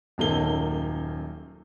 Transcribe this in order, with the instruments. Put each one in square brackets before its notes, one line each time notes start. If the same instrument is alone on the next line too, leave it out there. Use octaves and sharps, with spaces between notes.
[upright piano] D#1 F#2 A#3 D#4 A4 G7